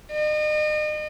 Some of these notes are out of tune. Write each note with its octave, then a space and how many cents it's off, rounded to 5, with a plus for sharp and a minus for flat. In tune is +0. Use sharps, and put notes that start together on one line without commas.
D#5 -40